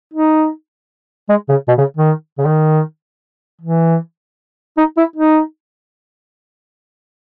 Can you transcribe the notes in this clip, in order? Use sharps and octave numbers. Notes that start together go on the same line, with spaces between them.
D#4
G#3
C#3
B2
C#3
D#3
C#3
D#3
E3
D#4
E4
D#4